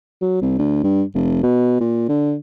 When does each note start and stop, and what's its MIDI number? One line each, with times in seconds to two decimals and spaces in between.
0.21 0.38 54
0.41 0.56 36
0.58 0.81 38
0.84 1.02 43
1.15 1.42 29
1.43 1.76 47
1.80 2.07 46
2.08 2.35 50